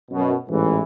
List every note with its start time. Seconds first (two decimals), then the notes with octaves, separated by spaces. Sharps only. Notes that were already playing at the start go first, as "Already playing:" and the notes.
0.11 F#2 B2
0.49 A1 G#2 E3